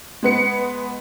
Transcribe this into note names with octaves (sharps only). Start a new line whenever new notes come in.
G#3 B3 C#7